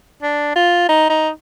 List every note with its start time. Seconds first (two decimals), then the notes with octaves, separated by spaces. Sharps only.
0.22 D4
0.55 F4
0.89 D#4
1.10 D#4